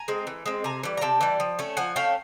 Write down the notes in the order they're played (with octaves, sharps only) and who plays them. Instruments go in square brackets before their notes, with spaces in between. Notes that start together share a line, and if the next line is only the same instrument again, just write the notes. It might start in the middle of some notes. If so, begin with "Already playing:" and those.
Already playing: [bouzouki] G#5 A#5
G#3 C4
E3
G#3 C4
C3 G#5 A#5
E3 G3
A#5
C3 G5 A5
E3 G3
F3
A3 C#4
F3 F#5 G#5
A3 C#4 F5 G5